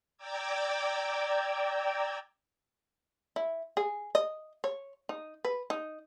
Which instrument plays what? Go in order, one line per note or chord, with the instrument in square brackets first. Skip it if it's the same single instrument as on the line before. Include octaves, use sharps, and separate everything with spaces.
[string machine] D5 G5 A#5 D6 E6 G#6
[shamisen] E4
G#4
D#5
C#5
D#4
B4
D#4